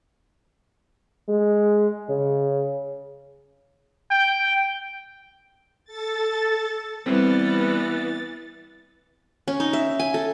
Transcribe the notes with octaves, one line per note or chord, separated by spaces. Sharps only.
G#3
C#3
G5
A4 A6
E3 G3 B3 C4 A6
C#4
D#4
E5
G#5
A4